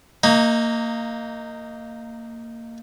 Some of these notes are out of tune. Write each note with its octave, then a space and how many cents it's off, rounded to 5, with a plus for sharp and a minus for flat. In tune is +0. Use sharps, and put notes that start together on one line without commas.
A#3 -20 D#4 +0